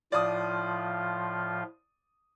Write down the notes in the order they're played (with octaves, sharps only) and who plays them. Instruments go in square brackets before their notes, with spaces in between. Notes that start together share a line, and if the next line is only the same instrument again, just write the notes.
[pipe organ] A2 F3 F4 [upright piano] D5 D#6